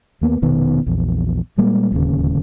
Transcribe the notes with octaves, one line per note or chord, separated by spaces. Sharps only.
D#2 A#3 B3
F1 B2 D#3 B3
A#1 E2
A#2 G3 G#3 A#3
D1 D#2 C#3